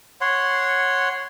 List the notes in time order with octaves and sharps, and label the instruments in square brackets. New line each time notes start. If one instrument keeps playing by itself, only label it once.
[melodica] C#5 F#5 C6